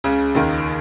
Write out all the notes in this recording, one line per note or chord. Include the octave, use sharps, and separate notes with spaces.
C#2 C#3
D#2 D#3